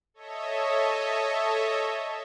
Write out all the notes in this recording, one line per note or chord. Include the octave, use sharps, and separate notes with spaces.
A4 C#5 D#5 E5